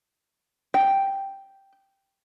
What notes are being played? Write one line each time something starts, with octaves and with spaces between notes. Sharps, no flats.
G5